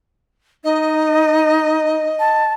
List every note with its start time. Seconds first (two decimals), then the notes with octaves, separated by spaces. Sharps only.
0.64 D#4 D#5
2.19 A5